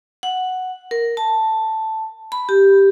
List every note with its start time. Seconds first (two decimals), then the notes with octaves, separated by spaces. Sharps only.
0.23 F#5
0.91 A#4
1.17 A5
2.32 B5
2.49 G4